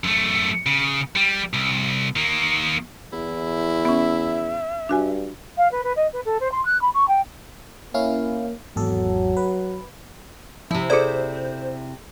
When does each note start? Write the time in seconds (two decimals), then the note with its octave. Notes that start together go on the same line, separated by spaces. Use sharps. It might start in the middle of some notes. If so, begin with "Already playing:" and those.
0.04 F#2 A3
0.66 C#3
1.16 G3
1.53 C2
2.16 D#3 A#3
3.13 E2 E4
3.85 B3 C#4 E5
4.89 G2 D4 F#4 G#5
5.58 F5
5.72 B4
5.84 B4
5.96 D#5
6.13 B4
6.26 A4
6.41 C5
6.52 C6
6.65 F#6
6.82 B5
6.94 C#6
7.08 G5
7.94 A#3 C#4 E4 F5
8.76 G#1 E2 F#3 A4
9.37 B4
10.71 C3 F3 E4
10.90 G#4 A4 C5 D5